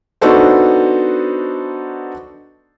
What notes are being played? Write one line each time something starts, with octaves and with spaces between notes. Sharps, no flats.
B3 D4 D#4 F#4 A4 C5